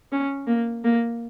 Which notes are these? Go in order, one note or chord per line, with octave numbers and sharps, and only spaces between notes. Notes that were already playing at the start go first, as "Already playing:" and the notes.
C#4
A#3
A#3